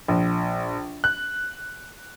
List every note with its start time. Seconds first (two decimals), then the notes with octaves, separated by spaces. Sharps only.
0.08 A#1
1.04 F#6